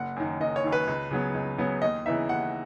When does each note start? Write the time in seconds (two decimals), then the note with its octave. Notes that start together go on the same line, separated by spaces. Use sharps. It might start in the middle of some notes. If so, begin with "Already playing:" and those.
Already playing: F#1 F#5
0.16 F#2 D#3
0.41 F#1 D#5
0.56 C#5
0.64 F#2 D#3
0.72 B4
0.88 C#2
1.11 C#3 F#3 B3
1.34 C#2
1.58 C#3 F#3 B3
1.82 D#2 D#5
2.06 C#3 E3 B3 D#4 E5
2.29 D#2 F#5